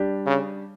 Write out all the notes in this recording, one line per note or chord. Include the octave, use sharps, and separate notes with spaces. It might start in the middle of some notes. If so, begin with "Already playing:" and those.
Already playing: G3 D4 G4
C#3